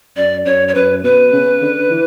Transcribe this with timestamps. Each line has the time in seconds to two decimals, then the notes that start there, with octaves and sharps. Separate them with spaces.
0.16 F#2 D5
0.45 F#2 C#5
0.68 C#5
0.75 F#2 B4
1.03 B2 B4
1.33 C#3
1.62 D3
1.91 E3